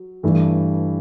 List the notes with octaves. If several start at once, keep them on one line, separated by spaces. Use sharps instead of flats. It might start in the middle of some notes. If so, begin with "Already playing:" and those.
Already playing: F#3
G2 E3 A3